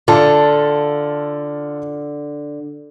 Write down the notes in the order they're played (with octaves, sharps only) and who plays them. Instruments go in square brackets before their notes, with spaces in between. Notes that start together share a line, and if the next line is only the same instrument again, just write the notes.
[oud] D3 [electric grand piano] F4 A4 A5